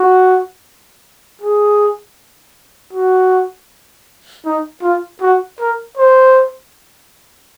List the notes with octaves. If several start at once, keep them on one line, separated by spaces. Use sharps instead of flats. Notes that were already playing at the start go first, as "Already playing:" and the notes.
Already playing: F#4
G#4
F#4
D#4
F4
F#4
A#4
C5